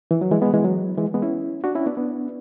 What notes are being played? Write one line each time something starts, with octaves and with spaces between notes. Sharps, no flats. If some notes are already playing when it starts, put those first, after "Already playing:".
E3
F#3
E3 G#3
G#3 B3
E3 G#3
F#3
E3 G#3
G#3 B3
C#4 E4
D4 F#4
C#4 E4
B3 D4
B3 D4